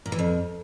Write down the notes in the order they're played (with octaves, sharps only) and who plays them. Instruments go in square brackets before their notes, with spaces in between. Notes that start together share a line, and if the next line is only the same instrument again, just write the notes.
[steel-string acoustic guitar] A#2
E3
F2